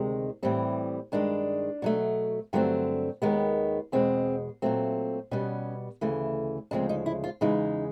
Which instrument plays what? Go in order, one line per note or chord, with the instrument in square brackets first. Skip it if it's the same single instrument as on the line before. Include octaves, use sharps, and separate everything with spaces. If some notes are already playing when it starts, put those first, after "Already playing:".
Already playing: [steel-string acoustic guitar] D2 C3 D#3 G#3
A2 E3 G3 C4
G2 D#3 G#3 D4
B2 F#3 A3
G2 D3 F#3 A3 C4
D#2 D#3 G#3 B3
E2 B2 G#3 C4
A#2 F#3 A3 C4
B2 G3 B3 C#4
D2 C#3 E3 A3
D2 C#3 F3 G#3 C4 D4
D#4
E4
F4
E2 C#3 E3 G#3 D#4